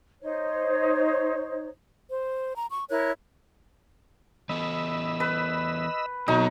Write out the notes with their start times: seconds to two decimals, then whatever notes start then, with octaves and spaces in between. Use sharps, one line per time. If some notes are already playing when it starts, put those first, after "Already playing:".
0.22 D#4 C5 C#5
2.10 C5
2.56 A#5
2.71 C#6
2.90 E4 A#4 C#5 F#6
4.49 E3 B3 A4 D#5 B5 E6
5.20 B4
6.28 B2 F#3 C4 D#4 A4